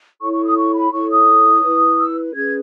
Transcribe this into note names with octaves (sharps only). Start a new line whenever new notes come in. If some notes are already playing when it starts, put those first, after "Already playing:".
E4 A4 C#5 C#6
C#6
D#6
C#6
B5
E4 A4 C#5 C#6
D#6
E4 B4
E6
C#4 G#4 B4 G#6